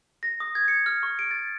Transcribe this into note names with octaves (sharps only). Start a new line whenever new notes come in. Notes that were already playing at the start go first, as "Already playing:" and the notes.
A#6
D#6
G#6
C#7
F6
C#6
D7
A6